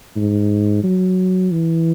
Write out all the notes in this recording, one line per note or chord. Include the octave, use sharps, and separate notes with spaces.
G#2
F#3
E3